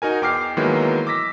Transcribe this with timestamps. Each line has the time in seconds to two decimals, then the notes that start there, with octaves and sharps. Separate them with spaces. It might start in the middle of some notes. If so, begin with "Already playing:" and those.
0.02 D#4 F#4 A#4 G#5
0.22 E2 G5 D6 F6 C7
0.57 D#3 E3 F#3 G#3 A#3 B3
1.07 D6 E6 A#6 B6